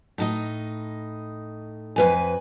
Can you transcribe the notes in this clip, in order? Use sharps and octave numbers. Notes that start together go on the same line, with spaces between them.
A2 D#4 D#5
F2 B4 G#5